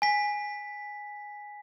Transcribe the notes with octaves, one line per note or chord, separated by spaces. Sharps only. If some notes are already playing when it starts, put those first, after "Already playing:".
G#5 B6